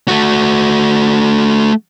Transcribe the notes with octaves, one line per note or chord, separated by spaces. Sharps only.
A3 F#4